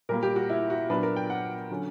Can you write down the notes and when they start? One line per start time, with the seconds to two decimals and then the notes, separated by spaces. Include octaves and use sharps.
0.09 A#2 G3 A#3 A#4
0.23 G4
0.36 F#4
0.49 E4
0.70 F#4
0.90 A#2 F#3 B3 D4 B4
1.03 A#4
1.16 G5
1.30 F#5
1.71 D3 F#3 C#4